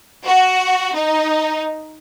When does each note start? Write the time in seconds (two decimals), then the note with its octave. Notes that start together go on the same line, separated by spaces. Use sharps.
0.24 F#4
0.93 D#4